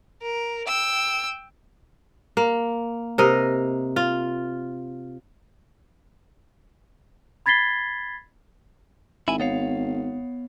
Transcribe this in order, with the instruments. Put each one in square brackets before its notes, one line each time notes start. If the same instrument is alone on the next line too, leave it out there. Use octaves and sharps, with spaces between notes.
[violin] A#4
G5 E6
[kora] A#3
C3 A#4 D#5
F4
[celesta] B5 G#6 A6 B6 C7 G7
[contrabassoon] G#1 [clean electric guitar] E4 G#5
[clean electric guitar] B3 C#5 F5